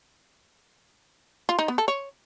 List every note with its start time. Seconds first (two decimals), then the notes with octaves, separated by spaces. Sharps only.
1.49 F4
1.59 D#4
1.68 B3
1.78 A4
1.88 C#5